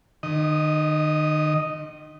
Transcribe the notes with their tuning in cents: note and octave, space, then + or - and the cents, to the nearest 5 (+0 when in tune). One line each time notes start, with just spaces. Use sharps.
D#3 -35 D#5 +0